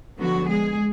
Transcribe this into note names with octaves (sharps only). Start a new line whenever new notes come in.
D3 F3 F#3 B3 F#4
G#3 G#4